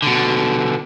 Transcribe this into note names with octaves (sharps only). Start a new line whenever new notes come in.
B2 D3